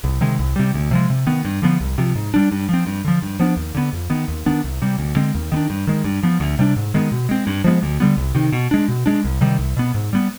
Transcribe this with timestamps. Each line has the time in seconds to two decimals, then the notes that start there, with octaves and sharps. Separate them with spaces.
0.04 C2
0.21 C3 D#3 G#3
0.39 C2
0.56 C3 G3
0.74 D2
0.91 C3 F3 G#3
1.10 C3
1.27 D#3 B3
1.45 G2
1.62 D3 F3 B3
1.80 C2
1.98 C3 F3
2.15 G#2
2.34 G3 D4
2.52 G2
2.69 F3 C4
2.87 G2
3.04 D3 F3
3.22 G2
3.39 F3 B3 D4
3.57 D#2
3.75 D3 G#3 B3
3.93 F2
4.10 D#3 B3
4.28 D#2
4.46 D#3 B3 D4
4.64 C2
4.82 C3 G3
4.98 D2
5.16 D3 G#3 C4
5.35 D#2
5.52 D#3 B3
5.57 D4
5.70 G2
5.87 D#3 G#3
6.04 G2
6.23 F3 B3
6.40 D2
6.59 C3 G3 D4
6.76 G#2
6.94 D#3 G#3 B3
7.12 B2
7.29 G#3 C4
7.47 G2
7.64 F3 G#3 B3
7.83 D2
8.00 D3 G3 B3
8.17 C2
8.35 C3 D#3
8.52 B2
8.71 G#3 D4
8.88 B2
9.06 G#3 D4
9.24 C2
9.41 C3 D#3 G3
9.59 C2
9.77 B2 B3
9.95 G#2
10.13 G3 B3